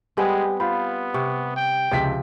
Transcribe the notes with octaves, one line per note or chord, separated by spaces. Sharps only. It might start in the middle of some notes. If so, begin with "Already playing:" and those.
G3 G#3 B3 C4 G4 G#5
B3 F4 C5 B5
C3 C#6
G5
C#2 C3 F3 B6